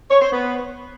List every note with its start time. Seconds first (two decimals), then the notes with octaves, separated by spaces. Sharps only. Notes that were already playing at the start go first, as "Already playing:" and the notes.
0.09 C#5
0.20 C5
0.31 B3